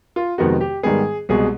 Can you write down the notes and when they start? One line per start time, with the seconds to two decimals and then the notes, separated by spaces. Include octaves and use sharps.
0.16 F4
0.38 F2 C3 D#3 G#3 B3 F#4
0.61 G4
0.83 G#2 D#3 G3 B3 G#4
1.29 C2 B2 G#3 G#4